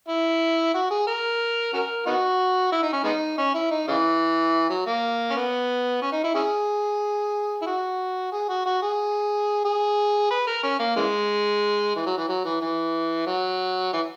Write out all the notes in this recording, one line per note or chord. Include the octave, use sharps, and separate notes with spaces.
E4
F#4
G#4
A#4
C#4 F#4 A#4
B3 D#4 F#4
E4
D#4
C#4
G#3 B3 D#4
C#4
E4
D#4
C#3 E3
F#3
A#3
C#4
B3
C#4
D#4
E4
C#4 E4 G#4
E4
F#4
G#4
F#4
F#4
G#4
G#4
B4
A#4
C#4
A#3
C#3 E3 G#3
E3
F#3
E3
F#3
E3
E3
F#3
E3